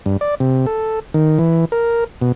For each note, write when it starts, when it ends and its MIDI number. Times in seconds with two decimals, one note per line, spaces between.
0.06 0.17 43
0.21 0.35 74
0.40 0.66 48
0.66 1.00 69
1.14 1.39 51
1.39 1.65 52
1.72 2.04 70
2.22 2.32 47